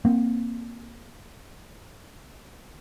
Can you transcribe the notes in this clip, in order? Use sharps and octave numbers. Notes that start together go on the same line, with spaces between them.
A#3 C4